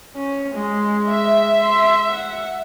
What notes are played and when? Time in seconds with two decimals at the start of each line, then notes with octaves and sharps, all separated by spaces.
0.16 C#4
0.55 G#3
1.09 E5
1.61 C6
2.09 F#5